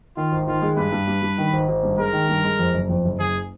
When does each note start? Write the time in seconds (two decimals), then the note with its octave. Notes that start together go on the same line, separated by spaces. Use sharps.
0.17 D#3 F4
0.32 G#1
0.47 D#3 F4
0.62 G#3
0.77 G2 B4
0.92 G2
1.07 G2
1.22 G2
1.38 D#3
1.53 G#1
1.68 G#1
1.83 G2
1.98 G#3 A#4
2.13 D#3
2.29 G2
2.44 G#3
2.59 F2
2.74 F#1
2.89 F2
3.05 F#1
3.19 F#1 G#4